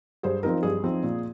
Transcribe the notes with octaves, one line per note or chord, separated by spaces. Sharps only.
G2 G#4 C5
F3 C4 D#4 A#4
G2 G#4
F3 C4 D#4
A#2